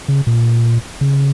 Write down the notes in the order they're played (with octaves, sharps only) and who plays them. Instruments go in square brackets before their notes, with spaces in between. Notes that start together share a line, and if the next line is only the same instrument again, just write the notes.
[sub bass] C#3
A#2
C#3